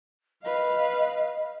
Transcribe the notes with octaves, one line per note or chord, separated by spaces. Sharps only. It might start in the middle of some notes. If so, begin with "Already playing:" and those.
B4 D#5 F5